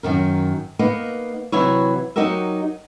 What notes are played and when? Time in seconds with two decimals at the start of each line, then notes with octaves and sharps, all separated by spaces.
0.03 F#2 D#3 A#4
0.79 A#3 B3 D#4
1.52 C3 E3 F#3 E4 B4 C#5
2.16 F#3 D#4 F#4 G4 A#4 E5